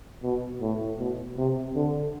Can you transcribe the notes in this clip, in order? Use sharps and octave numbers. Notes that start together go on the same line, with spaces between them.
B2
A2
B2
C3
D3